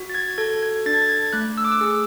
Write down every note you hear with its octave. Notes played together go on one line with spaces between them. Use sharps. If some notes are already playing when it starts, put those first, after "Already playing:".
Already playing: F#4
A6
G#6
A4 G#6
G#6
D4 A6
G#6
A6
G#6
A3 F#6
E6
D6
E6
G#4